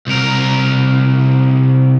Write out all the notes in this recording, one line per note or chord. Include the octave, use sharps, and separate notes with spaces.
C2 A#4